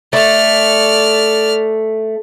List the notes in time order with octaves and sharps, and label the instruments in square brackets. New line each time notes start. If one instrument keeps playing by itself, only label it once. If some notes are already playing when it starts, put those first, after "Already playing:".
[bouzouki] A3 [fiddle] D5 F6